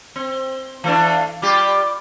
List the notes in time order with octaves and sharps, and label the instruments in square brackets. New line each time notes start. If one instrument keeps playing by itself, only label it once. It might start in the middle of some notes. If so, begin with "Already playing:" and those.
[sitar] C4
[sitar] E3 A3 D4 [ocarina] F5
[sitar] G3 F4 G4 [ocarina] D6